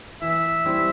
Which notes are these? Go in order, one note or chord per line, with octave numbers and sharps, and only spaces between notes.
E3 E5
G3 C4 E4